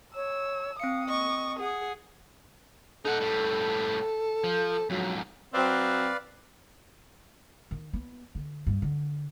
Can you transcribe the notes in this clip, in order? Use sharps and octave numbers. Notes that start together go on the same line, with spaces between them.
C#5 E6
C4 F5 D#6 C#7
D#5 C#6
G#4 F#5
D#4 A4 F#5
A2 G3
F3
F2 G#2 F#3
F#3 C4 B4 D5 F5
D#3
B3
D3
G2
D3